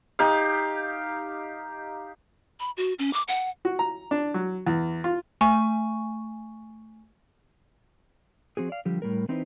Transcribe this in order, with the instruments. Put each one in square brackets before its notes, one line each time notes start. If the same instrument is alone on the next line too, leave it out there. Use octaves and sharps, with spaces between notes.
[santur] D#4 G4 F5
[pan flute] B5
F#4
C#4
D6
F#5
[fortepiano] F#4
A#5
D4
F#3
E2
F4
[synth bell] A3 G#5 C#6
[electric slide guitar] F3 C4 F#4 G#4
D5 F5
D3 F3 G3 G4
A2 G3 A#4
E3 C4 D#4 E4 B4 C5